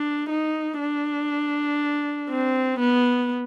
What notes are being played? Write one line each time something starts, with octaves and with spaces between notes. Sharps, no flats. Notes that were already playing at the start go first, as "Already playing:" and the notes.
Already playing: D4
D#4
D4
C4
B3